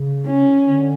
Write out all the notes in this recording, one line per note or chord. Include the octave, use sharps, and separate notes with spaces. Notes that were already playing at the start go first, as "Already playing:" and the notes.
Already playing: C#3
C#4
D3